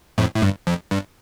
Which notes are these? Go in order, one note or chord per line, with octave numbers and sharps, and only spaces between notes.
F2 A2
A2
G2
F2
G2